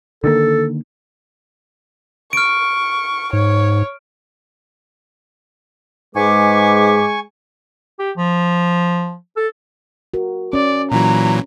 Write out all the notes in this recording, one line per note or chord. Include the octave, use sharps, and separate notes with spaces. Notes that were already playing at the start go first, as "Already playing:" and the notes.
D3 D#3 A#3 A4
C#6 F6 D7
G#2 C#5
G#2 G#3 B4 G#5 B5 C#6 D6
G4
F3
A4
F#4 A#4
C#4 D5
A#2 E3 F#3 A#5